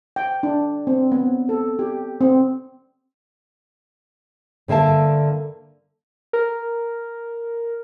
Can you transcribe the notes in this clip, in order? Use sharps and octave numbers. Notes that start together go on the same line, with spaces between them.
G5
D4
C4
B3
A4
G4
C4
G2 D3 A#3 E5 A5
A#4